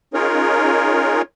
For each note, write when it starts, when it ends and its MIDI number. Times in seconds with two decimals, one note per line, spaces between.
0.14 1.22 61
0.14 1.22 63
0.14 1.22 65
0.14 1.22 68
0.14 1.22 70
0.14 1.22 73